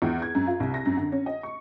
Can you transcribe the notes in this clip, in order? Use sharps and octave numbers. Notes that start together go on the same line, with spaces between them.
E2
G#6
F#2
F4
C2
A#6
F#2
D3
C#4
D#5
C#6